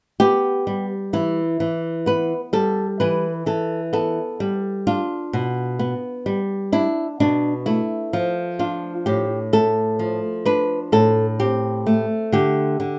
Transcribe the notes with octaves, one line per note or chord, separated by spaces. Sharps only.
B3 G4
G3
E3 E4
E3
B3 B4
G3 A4
E3 B4
E3 A4
B3 A4
G3
D4 F4
B2
B3
G3
D4 E4
B2 D4
A3 E4
F3
D4 F4
A2 G4
A3 A4
F3
D4 B4
A2 A4
C4 G4
A3
D3 G4
D3